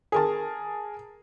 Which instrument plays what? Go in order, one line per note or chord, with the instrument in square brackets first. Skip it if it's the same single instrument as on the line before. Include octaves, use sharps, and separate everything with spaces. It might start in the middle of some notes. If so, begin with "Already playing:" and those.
[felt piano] G#4 A#4 A5